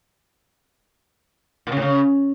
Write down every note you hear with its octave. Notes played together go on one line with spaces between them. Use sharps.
A#2
C#3
A2
C#3